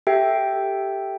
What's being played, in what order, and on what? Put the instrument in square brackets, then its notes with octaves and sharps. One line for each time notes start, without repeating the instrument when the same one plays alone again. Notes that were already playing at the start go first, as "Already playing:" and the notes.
[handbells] G4 A4 E5 G5